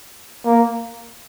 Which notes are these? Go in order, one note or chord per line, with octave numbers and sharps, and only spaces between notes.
A#3